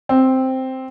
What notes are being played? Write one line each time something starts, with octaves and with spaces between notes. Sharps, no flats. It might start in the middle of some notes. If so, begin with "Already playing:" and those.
C4